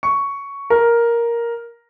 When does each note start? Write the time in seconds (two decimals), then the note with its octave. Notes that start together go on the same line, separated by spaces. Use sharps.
0.03 C#6
0.70 A#4